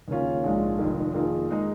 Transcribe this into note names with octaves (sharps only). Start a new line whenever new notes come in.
D#2 C#3 A#3 C#4 F4
A#1 G#2 G#3 F4
F1 F2 D#3
F2 D#3 A#3 F4 G#4
G#3 D#4